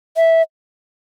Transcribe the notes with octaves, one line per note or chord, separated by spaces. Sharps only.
E5